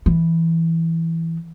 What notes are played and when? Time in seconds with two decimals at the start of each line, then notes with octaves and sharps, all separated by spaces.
0.06 E3